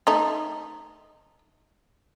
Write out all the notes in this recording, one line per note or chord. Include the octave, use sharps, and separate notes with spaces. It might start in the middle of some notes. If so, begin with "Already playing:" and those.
A3 D#4